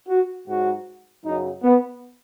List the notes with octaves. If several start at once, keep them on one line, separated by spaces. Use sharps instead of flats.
F#4
G#2 F#3 F#4
F#2 C#3 F#3 D#4
B3